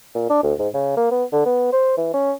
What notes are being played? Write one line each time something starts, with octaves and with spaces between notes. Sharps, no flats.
A#2
D4
D2
G#2
C#3
A#3
B3
D3
B3
C5
E3
C#4